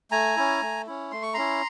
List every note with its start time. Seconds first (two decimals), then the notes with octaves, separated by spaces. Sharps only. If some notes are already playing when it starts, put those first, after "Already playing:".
0.11 A3 G#5 A#5
0.36 C#4 E4
0.62 A3
0.87 C#4 E4
1.12 A3 C6
1.22 C#6
1.34 C#4 E4 A#5 C6